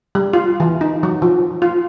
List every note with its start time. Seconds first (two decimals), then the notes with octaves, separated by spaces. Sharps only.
0.15 G3
0.33 F4
0.60 E3
0.81 D#4
1.03 F#3
1.22 F3
1.62 F4